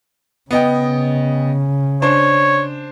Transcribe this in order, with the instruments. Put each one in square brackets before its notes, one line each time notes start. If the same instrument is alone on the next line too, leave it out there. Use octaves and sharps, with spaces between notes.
[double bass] C#3 [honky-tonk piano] B3 D#5 G5
[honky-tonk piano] D4 C5 [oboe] C#5